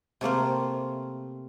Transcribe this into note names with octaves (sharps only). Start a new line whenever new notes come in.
C3 A3 A#3 C4